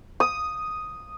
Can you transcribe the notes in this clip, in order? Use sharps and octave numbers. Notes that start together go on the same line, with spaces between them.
D#6